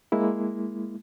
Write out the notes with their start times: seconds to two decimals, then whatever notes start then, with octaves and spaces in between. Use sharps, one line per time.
0.12 G#3 A#3 E4